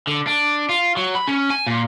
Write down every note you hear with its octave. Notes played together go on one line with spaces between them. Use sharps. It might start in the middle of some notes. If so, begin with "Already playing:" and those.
D3
D4
F4
F#3
B5
C#4
G#5
A#2